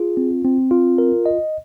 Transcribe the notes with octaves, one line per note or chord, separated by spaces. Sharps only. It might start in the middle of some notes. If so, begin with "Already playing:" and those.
Already playing: F4 G#4
C4
C4
F4
A#4
D#5